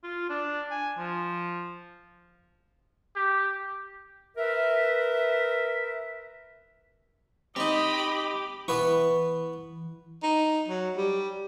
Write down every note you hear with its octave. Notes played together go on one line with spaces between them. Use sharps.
F4
D4
G#5
F3
G4
A#4 B4 E5
C4 D#4 G4 D#5 B5
E3 B3 B4 C#6
D#4
F#3
G3